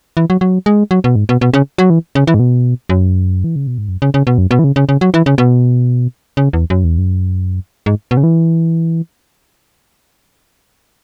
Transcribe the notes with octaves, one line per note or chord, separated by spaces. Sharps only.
E3
F#3
F#3
G#3
F#3
B2
G#2
B2
B2
C#3
F#3
E3
C#3
E3
G#2
B2
F#2
E3
C#3
B2
G#2
F#2
C#3
C#3
B2
F#2
B2
E3
C#3
C#3
C#3
F#3
E3
C#3
B2
C#3
E2
F#2
E2
F#2
G#2
B2
C#3
E3